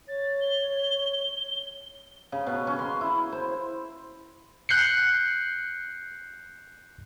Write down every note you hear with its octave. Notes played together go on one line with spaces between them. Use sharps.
C#5 A6
G7
C#3
B2
C#4
C6
E4
C5
F#6 G6 C7 C#7